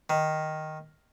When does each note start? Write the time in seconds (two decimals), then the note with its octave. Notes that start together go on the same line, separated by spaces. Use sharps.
0.10 D#3